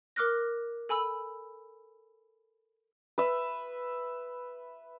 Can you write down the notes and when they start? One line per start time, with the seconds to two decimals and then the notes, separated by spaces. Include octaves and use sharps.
0.16 A#4 D6 F6 F#6 A#6
0.89 A4 G#5 B5 E6
3.18 B4 E5